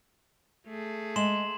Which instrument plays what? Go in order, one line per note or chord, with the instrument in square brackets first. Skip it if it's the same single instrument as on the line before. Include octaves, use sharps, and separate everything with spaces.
[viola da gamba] A3 G#4
[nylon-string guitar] G#3 [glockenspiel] C6 E7 F#7